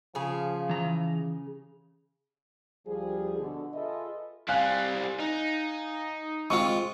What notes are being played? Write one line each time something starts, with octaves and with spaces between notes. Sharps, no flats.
C#3 F3 G#4
E3 A#5
D2 F3 G3 G#4
B2 D3
F4 G#4 A4 B4 D#5 E5
G3 C4 F5 G#5 F#6
D#4
G#3 C4 F4 C#6